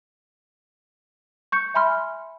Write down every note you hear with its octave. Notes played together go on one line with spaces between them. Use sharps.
C#6 G6 C#7
E5 G#5 B5 C6 F6